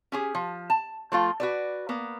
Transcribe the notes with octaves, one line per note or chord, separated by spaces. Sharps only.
C#4 G4 G#4
F3
A5
F3 A3 F4
F#4 B4 D5
A#3 B3